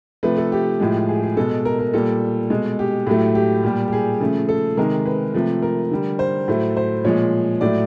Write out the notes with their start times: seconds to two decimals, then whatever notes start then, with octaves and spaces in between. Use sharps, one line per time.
0.23 C3 F3 A3 B4
0.37 A4
0.52 G4
0.80 A2 F3 G#3
1.08 G#4
1.23 G#4
1.37 B2 G#3 A4
1.65 A#4
1.79 A#4
1.93 A#2 G3 A4
2.50 B2 G#3
2.79 G4
3.07 A2 F#3 A3 G4
3.35 G4
3.63 A#2 G3
3.88 G4
3.93 G#4
4.20 C#3 F3 A3
4.49 A4
4.77 C3 D#3 G#3 A#4
5.05 B4
5.34 C3 F3 A3
5.62 A#4
5.91 D3 G3
6.19 C5
6.48 A2 F#3 A3
6.77 C5
7.05 A#2 F3 G#3 C#5
7.61 A2 F#3 A3 D5